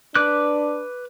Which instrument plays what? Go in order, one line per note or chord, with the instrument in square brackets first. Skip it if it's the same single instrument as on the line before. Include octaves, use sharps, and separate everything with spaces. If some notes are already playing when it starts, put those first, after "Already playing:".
[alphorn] D4 [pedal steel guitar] B4 D6 F#6